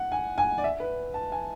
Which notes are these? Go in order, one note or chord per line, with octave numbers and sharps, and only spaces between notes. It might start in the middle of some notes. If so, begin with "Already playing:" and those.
Already playing: F#5
G#5
G#5
D5
E5
B4
A5
G#5